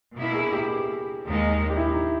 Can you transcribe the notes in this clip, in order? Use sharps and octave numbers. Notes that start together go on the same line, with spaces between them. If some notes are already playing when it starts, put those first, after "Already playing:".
B2 A#3 E4
G#4
G4
D#2 D#3 G#3 D#4
G4
E4
D#4